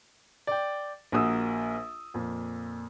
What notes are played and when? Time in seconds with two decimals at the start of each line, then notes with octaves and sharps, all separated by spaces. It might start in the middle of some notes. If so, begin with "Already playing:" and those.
0.47 D5 G5
1.12 A#1 A#3 F#4 D#6 E6
2.14 F2 A#2